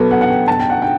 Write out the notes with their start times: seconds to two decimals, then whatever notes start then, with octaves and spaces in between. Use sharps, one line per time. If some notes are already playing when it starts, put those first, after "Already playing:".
Already playing: B2 F#3 B3 A4 B4
0.11 F#5
0.21 F#5
0.30 G5
0.48 A5
0.60 G5
0.70 F#5
0.82 G5